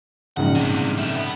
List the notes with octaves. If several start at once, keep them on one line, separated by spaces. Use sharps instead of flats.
A#1 G#2 C#3 F#5
G2 C3
C3 A3
B3